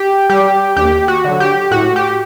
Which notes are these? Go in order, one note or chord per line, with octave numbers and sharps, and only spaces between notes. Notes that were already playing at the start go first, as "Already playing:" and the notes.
Already playing: G4
G3 G4
D#2 G4
F#4
D3 F#3
G4
A2 F#4
G4